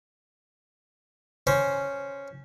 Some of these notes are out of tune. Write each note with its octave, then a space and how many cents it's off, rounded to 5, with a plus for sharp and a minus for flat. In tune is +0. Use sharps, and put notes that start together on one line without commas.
C#4 +0 C5 +0